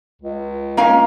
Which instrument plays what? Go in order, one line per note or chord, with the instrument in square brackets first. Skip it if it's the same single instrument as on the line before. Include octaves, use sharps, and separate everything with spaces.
[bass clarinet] C#2
[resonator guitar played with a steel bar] A#3 C#4 F5